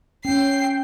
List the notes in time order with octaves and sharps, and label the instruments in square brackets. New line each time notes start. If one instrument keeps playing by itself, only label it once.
[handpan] C#4 [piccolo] G5 [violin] C7